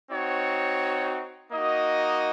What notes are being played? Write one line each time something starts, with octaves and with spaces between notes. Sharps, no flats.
C4 D#4 F#4 C#5
A#3 D#4 F#4 D#5